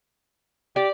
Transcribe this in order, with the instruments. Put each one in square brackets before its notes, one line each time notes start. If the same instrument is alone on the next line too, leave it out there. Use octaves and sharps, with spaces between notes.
[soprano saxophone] G4 [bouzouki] D5